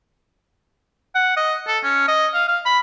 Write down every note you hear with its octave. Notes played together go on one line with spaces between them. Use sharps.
F#5
D#5
A4
C#4
D#5
F5
F5
B5